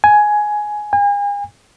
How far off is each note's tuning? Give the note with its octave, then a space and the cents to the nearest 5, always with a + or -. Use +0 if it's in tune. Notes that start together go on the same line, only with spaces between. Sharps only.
G#5 +10
G#5 -40